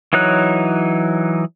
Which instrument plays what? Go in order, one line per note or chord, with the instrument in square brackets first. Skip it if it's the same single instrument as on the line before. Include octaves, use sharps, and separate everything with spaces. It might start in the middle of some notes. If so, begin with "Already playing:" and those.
[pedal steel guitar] E3 F#3 D#4 C#5 F#6